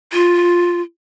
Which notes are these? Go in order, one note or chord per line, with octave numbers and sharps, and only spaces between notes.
F4